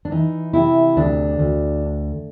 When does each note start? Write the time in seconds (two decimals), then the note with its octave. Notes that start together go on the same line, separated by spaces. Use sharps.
0.05 D4
0.11 E3 D#4
0.53 C3 E4
0.97 D2 D4
1.39 D2